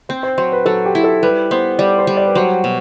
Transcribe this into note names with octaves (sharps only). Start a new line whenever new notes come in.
C4 C5
C5
F#3 C5
B4
F#3 A4
G4
E4
A4
G3 B4
B3 C5
G3 D5
C5
G3
D5
B4
F#3 C5
B2